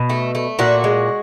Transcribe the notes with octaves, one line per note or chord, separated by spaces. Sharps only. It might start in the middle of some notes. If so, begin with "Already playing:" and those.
Already playing: B2
A3
A3
A#2 F#4
G#3